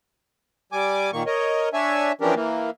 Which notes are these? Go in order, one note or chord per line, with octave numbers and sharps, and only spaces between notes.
G3 G#5 D6
A#2 D#3 A#3 C#6
A#4 C#5 D#5
D4 C#5 E5 G#5
E3 F3 C#4 D4 G4 A#4
E3 A#3